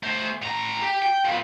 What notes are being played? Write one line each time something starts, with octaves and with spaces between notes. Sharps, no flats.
A3 C5
A2 A#5
G4
G5
F3 B3